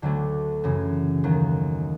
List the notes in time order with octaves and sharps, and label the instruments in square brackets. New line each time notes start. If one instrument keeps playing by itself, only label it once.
[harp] D2 D3 F#3 A3
F#2 C#3 E3
D#2 D#3 F#3